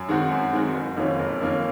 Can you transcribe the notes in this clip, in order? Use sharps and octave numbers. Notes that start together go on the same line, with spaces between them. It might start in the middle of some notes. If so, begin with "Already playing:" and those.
Already playing: F#2
D#3 G#3 C4 F#4
F#2
D#3 G#3 C4 F#4
F#1
F2 D#3 A#3 C#4
F#1
F2 D#3 A#3 C#4